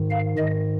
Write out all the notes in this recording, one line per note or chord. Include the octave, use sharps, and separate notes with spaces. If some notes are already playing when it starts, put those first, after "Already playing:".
Already playing: G#2 D#3
F5
G#2 D#3 D#5